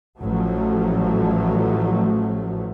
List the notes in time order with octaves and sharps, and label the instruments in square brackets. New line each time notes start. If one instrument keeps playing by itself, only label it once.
[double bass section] A1 F3 F#3 A3